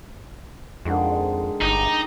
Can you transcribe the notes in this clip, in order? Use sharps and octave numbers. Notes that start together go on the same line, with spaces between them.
F2 D3 D#3 G#3
G1 D#4 G4 D#5